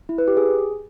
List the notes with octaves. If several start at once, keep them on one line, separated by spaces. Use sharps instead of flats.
E4
B4
G4
G#4